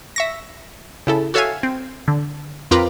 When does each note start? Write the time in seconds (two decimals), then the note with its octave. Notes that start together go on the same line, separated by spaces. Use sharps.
0.16 E5 C#6 A#6
1.07 C#3 E4 A4
1.34 F#4 A4 C#5 E5 F5 G#5
1.63 C4
2.08 D3
2.71 F2 C4 F4 A#4 B4 D6